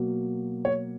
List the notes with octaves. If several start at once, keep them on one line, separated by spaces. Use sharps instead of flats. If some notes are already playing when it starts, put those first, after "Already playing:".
Already playing: B2 F#3 A#3
C#5